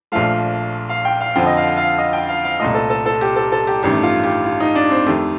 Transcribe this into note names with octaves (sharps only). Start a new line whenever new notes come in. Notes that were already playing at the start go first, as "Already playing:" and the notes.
A#1 A#2 F3 A3 F5
F5
G5
F5
F2 D3 F3 G5
D#5
F5
F5
D#5
G5
F5
F5
C2 A#2 A3 D#5
A4
A4
A4
G4
A4
A4
G4
A1 G2 D#3 A3 G4
F4
G4
F4
D#4
D4
C4
F2 D#3 A3 G4